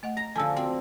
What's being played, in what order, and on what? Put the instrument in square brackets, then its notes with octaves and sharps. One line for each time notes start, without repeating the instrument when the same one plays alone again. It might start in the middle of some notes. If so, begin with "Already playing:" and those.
[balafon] A3 D#5 F#5
[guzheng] A#5 [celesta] A#6
[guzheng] D3 F3 [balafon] A4 [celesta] G#5 A5 E6
[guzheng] C4 [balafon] F#4 A5 [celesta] G5